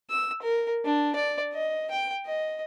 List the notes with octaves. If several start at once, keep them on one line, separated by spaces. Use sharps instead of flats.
E6
A#4
D4
D5
D#5
G5
D#5